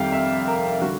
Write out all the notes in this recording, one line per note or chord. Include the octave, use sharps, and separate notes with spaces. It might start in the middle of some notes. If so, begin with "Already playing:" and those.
Already playing: F2 C3 D#3 G3 F5 G5
E5
A#4
D3 G3 F#4